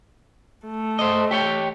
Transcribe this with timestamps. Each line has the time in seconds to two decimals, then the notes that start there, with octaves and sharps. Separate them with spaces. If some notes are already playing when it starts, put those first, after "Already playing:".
0.67 A3
0.99 C5 D#5
1.31 G4 C#5 G5